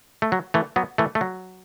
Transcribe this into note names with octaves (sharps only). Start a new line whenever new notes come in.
A3
F#3
E3 A3
F#3 B3
E3 A3
A3
F#3